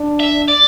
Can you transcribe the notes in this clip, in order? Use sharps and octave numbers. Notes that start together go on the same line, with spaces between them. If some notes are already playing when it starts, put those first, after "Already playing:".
Already playing: D4
E5
D5